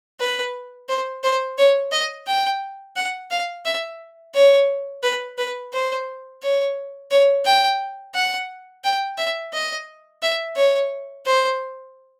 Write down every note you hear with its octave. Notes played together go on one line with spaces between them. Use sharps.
B4
C5
C5
C#5
D#5
G5
F#5
F5
E5
C#5
B4
B4
C5
C#5
C#5
G5
F#5
G5
E5
D#5
E5
C#5
C5